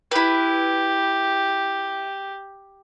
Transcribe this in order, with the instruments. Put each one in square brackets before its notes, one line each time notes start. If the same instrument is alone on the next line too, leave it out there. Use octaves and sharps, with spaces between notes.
[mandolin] E4 B4 [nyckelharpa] G4